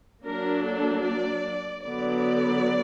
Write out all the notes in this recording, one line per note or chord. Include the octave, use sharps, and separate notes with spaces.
F#3 A#3 D4 A#4
A4
D5
D3 F#3 B3 D5